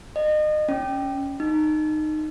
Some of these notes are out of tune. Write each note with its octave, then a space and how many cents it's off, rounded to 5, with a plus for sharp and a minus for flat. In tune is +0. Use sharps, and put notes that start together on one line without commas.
D#5 -35
C#4 +10
D#4 -15